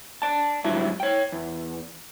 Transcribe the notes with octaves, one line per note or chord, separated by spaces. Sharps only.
D5 A5
G#2 D3 F#3 G3 E4 E5
C#5 G5
E2